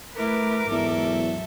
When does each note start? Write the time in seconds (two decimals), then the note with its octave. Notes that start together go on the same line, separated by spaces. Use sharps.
0.17 A3 E4 A#4 B4 D6
0.71 E2 G#2 F#3 A4 E5